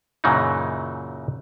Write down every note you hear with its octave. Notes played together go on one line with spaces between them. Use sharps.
F#2 A#2 C#3 E3 F#3 D#4